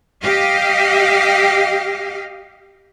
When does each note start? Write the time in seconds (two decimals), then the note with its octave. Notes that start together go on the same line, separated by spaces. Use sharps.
0.21 G4 D#5 F5